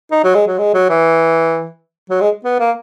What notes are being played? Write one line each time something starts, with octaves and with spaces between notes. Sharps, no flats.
D#4
F#3
G#3
F#3
G#3
F#3
E3
F#3
G#3
B3
A#3